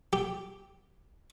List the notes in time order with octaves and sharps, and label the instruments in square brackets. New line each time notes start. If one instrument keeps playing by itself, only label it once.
[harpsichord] G4